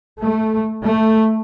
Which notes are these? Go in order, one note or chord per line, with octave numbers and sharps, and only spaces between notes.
A3
A3